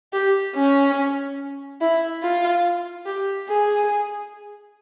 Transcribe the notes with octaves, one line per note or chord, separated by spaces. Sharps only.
G4
C#4
E4
F4
G4
G#4